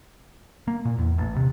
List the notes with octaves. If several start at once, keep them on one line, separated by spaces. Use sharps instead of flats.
A#3
A#2
E2
A1
C3